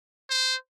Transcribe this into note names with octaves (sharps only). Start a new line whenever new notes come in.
C5